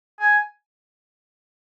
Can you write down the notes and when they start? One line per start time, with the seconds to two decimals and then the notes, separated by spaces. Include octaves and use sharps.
0.20 G#5